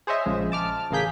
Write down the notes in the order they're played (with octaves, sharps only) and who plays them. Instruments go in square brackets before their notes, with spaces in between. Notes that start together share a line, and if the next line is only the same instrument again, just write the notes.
[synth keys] G#4 C5 C#5 D#5 E5
A#1 C#3 F3 G#3
A5 D6 F6
A1 C#3 A#3 G#4 G6 B6